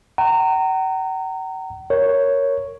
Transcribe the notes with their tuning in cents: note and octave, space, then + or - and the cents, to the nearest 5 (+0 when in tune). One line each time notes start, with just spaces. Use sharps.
F#5 +45 A#5 -20
A#4 +0 C#5 +0